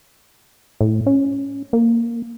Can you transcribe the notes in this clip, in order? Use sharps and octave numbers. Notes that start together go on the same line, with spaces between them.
A2
C#4
A#3